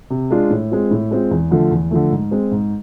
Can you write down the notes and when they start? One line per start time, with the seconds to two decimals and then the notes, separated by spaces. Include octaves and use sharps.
0.10 C3
0.31 G#3 D4 F4
0.51 A2
0.71 G#3 C4 F4
0.91 A2
1.11 G#3 C4 F4
1.31 E2
1.51 D3 F3 A3
1.71 E2
1.91 D3 F3 A3
2.11 G#2
2.31 G#3 C4
2.51 G#2